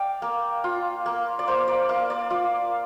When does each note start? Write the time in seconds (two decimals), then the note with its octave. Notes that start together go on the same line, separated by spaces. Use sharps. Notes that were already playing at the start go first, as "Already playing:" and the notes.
Already playing: D5 F5 G5
0.22 A#3
0.64 F4
1.06 A#3
1.39 D5
1.47 A#3 C5
1.68 D5
1.89 A#3 F5
2.10 D5
2.30 F4 F5